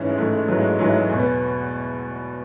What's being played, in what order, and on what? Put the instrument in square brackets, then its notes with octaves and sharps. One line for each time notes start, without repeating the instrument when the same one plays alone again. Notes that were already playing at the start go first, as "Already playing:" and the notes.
Already playing: [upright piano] G#2 E3 C#4
G#3
G#2 E3 A3
G#3
G#2 E3 F#3
G#3
G#3
G#2 E3 F#3
G#3
F#3
E2 B2
B3